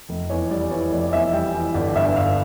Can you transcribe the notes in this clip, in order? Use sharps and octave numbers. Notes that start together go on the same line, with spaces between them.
F1
E2 C#5
G3 D5
E3 C#5
F1 D5
E2 E5
G3 G5
E3
G1 D5
G2 E5
G1 F5